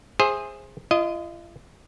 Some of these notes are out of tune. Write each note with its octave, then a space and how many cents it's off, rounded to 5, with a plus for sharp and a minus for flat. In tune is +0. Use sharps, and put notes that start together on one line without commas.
G#4 -10 C5 +15 E5 +0
F4 -40 D#5 +0